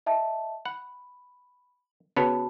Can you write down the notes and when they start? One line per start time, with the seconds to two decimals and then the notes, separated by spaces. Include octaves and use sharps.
0.06 D#5 E5 A5
0.65 F#5 B5
2.16 C#3 B3 F#4 C#5 A5 B5